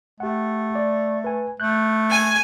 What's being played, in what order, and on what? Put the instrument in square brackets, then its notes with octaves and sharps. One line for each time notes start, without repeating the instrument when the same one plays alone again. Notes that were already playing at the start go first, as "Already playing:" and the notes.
[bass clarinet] A3 [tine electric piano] G4 F#5
[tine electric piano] D5
B4 G#5
[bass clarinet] A3 [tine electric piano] F#6 G6
[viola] G#5